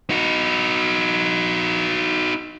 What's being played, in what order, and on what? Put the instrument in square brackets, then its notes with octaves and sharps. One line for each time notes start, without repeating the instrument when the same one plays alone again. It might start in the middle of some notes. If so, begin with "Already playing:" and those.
[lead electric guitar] D#4 F#4